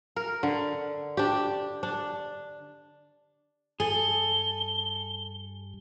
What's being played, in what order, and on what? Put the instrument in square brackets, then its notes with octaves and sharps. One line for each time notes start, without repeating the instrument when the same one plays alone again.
[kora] A#4
D3
D4 G4
D4
[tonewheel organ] G2 [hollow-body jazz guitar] G#4 [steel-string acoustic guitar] A4 [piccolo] G7